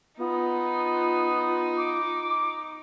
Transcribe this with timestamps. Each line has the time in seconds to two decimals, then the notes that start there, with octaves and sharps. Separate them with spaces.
0.19 B3 D#4 F4
1.77 D6